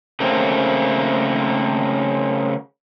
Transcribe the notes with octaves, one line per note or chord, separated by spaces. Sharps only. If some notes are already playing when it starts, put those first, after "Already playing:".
C#3 A3 A#3 C4